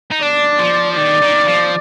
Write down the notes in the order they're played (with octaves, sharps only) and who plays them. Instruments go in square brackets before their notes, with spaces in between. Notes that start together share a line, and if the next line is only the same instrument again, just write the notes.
[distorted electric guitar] D#4
[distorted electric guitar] D4 [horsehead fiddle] D5
[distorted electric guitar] F3
[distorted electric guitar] D#3 [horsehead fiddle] D5
[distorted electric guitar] D#3
F3